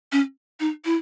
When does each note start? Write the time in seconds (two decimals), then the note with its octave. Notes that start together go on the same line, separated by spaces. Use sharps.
0.12 C#4
0.60 D#4
0.85 E4